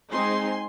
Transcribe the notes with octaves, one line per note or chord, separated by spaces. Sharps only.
G#3 C4 D#4 G#5 C6